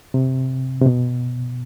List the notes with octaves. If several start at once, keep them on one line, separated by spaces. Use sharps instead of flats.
C3
C3
B2